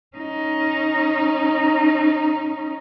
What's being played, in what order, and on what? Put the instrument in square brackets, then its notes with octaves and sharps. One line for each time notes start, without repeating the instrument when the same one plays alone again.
[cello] C#4 D#4